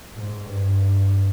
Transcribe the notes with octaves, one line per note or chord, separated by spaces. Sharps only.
G#2
G2